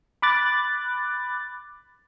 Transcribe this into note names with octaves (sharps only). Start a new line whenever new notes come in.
B5 D6 F#6 A6